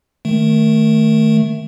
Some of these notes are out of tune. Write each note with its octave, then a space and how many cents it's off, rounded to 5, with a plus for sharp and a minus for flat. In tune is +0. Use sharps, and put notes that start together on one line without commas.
D#3 +0 A3 +0